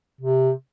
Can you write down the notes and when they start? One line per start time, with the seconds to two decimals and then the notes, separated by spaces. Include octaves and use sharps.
0.21 C3